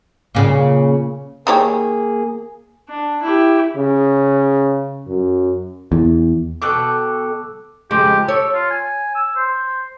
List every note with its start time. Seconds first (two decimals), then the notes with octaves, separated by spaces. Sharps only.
0.35 A#2 C#3
1.47 D#3 A#3 G4 G#4 C#5
2.89 D4
3.22 E4 G4
3.76 C#3
5.07 F#2
5.92 E2
6.62 B2 A4 G5 D6 E6 F#6
7.91 F2 C#3 G#3 G4
8.28 A4 C#5
8.54 F4
8.71 G#5
9.15 E6
9.36 C5